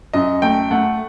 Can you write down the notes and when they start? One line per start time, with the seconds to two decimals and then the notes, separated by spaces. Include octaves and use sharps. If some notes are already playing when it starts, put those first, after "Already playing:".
0.13 F#2 D#5
0.42 A3 G5
0.71 A3 F#5